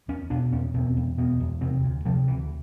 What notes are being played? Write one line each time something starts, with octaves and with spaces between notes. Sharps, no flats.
E2 C#4
B2 D4
E2 C#4
B2 C4
E2
B2 B3
E2
C3 C4
D2
C3 F3
D2 E3